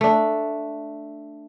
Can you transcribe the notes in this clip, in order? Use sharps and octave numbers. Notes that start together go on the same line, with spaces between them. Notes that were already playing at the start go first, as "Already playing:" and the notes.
A3 D4